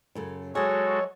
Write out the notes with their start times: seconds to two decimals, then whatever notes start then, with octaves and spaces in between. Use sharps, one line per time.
0.15 F#2 C#3 A4
0.55 F#3 G#3 F#4 G#4 A4 C#5